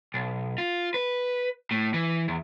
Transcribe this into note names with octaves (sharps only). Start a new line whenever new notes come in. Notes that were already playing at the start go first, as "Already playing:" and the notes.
B1
F4
B4
A2
E3
E2